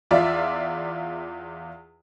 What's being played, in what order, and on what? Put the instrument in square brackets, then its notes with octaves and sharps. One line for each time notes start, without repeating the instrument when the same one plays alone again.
[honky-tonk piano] E2 F4 D5 E5